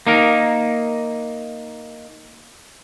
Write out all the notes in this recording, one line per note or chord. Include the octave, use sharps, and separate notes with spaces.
A#3 D#4 A#4